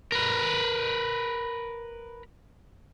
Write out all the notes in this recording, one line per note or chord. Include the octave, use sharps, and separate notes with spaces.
A#4 B4